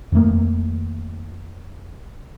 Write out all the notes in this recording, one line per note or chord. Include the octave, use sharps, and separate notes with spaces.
F2 D#3 A3 A#3